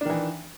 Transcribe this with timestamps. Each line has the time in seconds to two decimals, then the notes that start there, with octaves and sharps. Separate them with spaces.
0.01 D4
0.05 D#3
0.10 E3